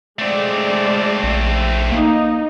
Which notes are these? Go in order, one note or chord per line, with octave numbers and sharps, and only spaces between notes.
G#3 A3 C4 D5
A#1
A#3 D#4